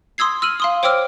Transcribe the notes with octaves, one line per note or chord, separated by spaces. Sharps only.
C6 D#6 E6 G#6 C7
E6 F6 D#7 F#7
F5 C6 D#6
C5 C#5 G5 D6 E6 F6